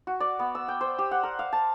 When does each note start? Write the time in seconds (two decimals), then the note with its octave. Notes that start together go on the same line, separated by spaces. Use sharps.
0.07 F#4
0.20 D5
0.39 B3
0.55 E6
0.68 G5
0.81 C5
0.99 G4
1.11 F#5
1.23 A#4
1.39 F5
1.53 A5